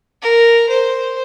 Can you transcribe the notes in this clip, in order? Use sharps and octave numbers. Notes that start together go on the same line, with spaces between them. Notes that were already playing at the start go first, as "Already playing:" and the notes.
A#4
C5